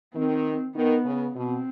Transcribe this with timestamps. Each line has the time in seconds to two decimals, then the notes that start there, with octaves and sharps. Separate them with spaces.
0.15 D#3 C4
0.75 D#3 B3
1.05 C#3
1.35 B2 C4